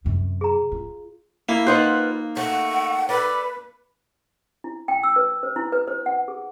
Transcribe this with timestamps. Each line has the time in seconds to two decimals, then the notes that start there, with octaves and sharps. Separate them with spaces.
0.04 F#2 C3
0.41 G#4 A#5
0.72 F4
1.49 A#3 E4
1.67 D#4 F4 B4 C5 F#5
2.37 A3 F#5
3.09 A4 B4 D5
4.64 E4
4.88 G5
5.03 E6
5.16 B4
5.43 C5
5.56 E4
5.72 B4
5.88 C5
6.06 F#5
6.28 G#4